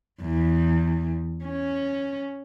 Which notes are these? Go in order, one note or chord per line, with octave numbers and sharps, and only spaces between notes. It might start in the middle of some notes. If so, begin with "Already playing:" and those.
E2
C#4